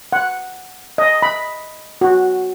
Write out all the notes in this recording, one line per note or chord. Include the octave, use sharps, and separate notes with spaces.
F#5
D#5
B5
F#4